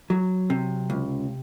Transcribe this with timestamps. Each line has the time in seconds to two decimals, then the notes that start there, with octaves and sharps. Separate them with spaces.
0.10 F#3
0.50 C3
0.90 C#2